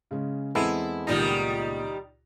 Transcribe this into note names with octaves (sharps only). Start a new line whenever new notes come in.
C#3 G#3 C#4
E2 G#3 B3 C4 E4 A4
C#2 A#2 D#3 G3 D#4 A#6